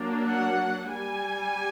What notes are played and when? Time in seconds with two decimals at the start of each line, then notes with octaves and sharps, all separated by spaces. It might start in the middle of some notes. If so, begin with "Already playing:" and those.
Already playing: F#3 A#3 D4
0.24 F#5
0.89 G3 G#5